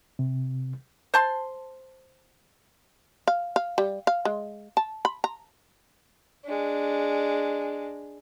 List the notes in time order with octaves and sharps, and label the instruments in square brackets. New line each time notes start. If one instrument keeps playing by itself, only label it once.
[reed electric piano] C3
[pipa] C5 A5 C6
[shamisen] F5
F5
G3
F5
G#3
A5
B5
A#5
[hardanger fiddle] G#3 D4